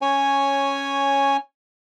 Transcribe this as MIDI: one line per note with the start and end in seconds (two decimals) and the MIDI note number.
0.02 1.37 61
0.02 1.37 73
0.02 1.37 80